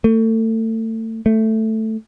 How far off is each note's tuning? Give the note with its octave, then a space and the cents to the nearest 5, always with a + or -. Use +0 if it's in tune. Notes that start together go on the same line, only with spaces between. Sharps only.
A3 +30
A3 +5